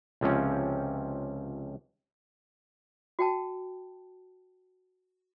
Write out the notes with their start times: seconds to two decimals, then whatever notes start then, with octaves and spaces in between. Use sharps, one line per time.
0.21 C#2 C3 F3 C4 C#4
3.19 F#4 G5 A5